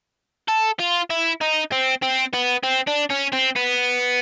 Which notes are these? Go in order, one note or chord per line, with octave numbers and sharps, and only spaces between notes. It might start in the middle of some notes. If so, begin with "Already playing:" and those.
A4
F4
E4
D#4
C4
C4
B3
C4
D4
C#4
C4
B3